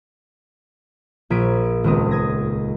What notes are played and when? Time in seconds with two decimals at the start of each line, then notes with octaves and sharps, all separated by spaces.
1.30 A#1 G#6 B6 D7 D#7
1.84 D#1 C#2 B3 C4 D#5
2.11 D#6 G#6 A#6